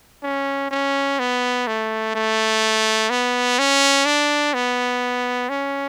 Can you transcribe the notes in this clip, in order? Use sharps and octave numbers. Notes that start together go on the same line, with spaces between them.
C#4
C#4
B3
A3
A3
B3
C#4
D4
B3
C#4